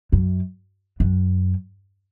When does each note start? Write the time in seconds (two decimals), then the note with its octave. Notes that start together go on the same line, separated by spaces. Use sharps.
0.12 F#2
1.00 F#2